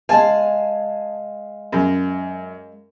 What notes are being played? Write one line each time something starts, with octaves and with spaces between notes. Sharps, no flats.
G#3 F5 G#5 A5
F#2